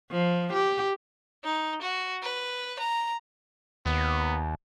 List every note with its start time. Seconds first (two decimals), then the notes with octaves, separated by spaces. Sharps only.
0.11 F3
0.53 G4
1.44 D#4
1.82 F#4
2.23 B4
2.79 A#5
3.86 D#2 B3